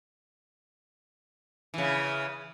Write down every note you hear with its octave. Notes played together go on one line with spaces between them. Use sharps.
C#3 E3